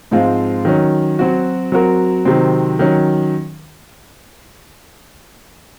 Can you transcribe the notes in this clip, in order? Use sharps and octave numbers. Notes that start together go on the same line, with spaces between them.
G#2 F3 G#3 C4 F4
D#3 F#3 C#4
F#3 C4 F#4
F#3 C4 F#4 A#4
C3 D#3 F#3 C4
D#3 F#3 C#4